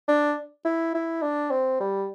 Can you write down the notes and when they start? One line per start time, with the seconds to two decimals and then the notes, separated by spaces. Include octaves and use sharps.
0.09 D4
0.65 E4
0.95 E4
1.22 D4
1.51 C4
1.81 G3